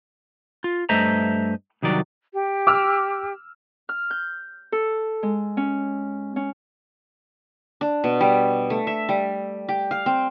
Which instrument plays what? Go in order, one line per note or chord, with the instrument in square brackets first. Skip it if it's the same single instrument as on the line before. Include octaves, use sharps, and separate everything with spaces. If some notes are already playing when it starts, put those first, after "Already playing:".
[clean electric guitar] F4
G2 A3 C5 D#5 E5 A#5
C2 D#3 F#3 D5
[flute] G4
[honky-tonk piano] D6 E6 F6
[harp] F6
G6
A4
G#3
C#4
C#4
[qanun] D4
B2
G3
A3
E5
G3
G4
F5
C4